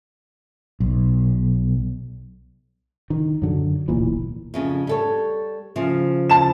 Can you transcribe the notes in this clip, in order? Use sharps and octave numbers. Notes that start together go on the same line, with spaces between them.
B1
D#3
F#2 D3 F#3
D1 B1 A#2 E3
F2 C#3 C#4
G3 A4 C#5
C#3 F3
A5 E7